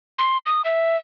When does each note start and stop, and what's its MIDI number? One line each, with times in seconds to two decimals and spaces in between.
0.19 0.38 84
0.46 0.62 87
0.65 0.97 76